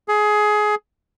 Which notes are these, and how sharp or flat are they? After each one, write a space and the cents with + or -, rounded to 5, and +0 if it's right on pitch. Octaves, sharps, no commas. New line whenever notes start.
G#4 +20